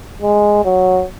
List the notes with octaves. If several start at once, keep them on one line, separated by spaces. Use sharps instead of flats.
G#3
F#3